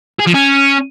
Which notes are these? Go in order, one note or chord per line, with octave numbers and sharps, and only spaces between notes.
G#4
F3
C#4